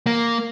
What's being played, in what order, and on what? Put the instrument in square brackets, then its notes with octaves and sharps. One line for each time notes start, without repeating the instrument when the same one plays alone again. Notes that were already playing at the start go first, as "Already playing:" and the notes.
[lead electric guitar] A#3